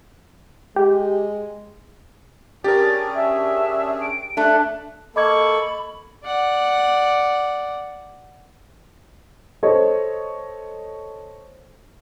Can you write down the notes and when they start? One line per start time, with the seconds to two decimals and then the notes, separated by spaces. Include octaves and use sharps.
0.76 G#3 G4
2.64 C#4 D4 G4 G#4 A#4 A6
3.15 E5
4.01 D7
4.37 A3 D4 F#6
5.16 A#3 A4 D#5 B5 C#6 D6 G#6
6.23 D5 F#5
9.63 A4 C5 C#5 D#5